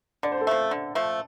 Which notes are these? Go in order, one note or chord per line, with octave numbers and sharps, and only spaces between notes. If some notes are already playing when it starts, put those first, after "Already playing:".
D3 D5
C5
A4
F3 A3 C5
D3
F3 A3